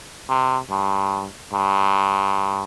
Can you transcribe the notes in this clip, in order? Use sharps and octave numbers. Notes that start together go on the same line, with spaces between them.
C3
G2
G2